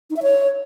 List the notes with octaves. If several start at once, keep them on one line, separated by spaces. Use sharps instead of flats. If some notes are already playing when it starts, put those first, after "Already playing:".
D#4
E5
C#5